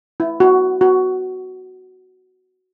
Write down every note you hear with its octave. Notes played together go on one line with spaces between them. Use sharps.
E4
F#4
F#4